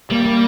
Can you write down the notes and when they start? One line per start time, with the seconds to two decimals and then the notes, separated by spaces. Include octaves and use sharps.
0.10 G3 A#3
0.25 A#3